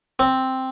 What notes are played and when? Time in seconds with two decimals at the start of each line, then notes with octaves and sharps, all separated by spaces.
0.19 C4